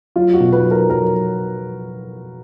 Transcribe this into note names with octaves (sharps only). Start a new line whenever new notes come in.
F#3 F4
F#4
B2
B4
F#3
A#4
F#3 A#4